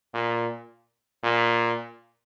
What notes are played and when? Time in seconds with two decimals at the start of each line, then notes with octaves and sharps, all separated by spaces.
0.14 A#2
1.23 A#2